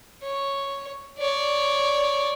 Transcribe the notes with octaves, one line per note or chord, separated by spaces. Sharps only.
C#5
C#5 D5